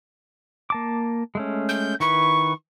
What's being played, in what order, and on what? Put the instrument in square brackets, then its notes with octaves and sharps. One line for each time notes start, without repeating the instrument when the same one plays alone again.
[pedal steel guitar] A#3 A5 D6
G#3 A3 C#4
[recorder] G6
[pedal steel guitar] D#3 E4 B4 [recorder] C#6